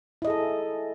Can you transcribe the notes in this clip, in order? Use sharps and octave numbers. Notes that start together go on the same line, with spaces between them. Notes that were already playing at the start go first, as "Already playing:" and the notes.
E4 G#4 A4 D#5